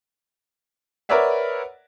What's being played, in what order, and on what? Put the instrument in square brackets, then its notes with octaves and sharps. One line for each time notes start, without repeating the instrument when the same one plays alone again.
[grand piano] A#4 B4 C#5 D5 E5 F#5